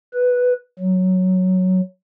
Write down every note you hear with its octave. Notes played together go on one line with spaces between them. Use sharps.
B4
F#3